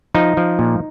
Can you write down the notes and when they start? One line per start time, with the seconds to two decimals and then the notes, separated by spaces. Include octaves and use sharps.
0.15 F3 D#4
0.37 F3
0.59 A#2